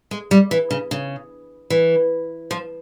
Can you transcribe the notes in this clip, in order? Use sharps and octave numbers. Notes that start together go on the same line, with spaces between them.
G#3
G3
E3
C#3
C#3
E3
F3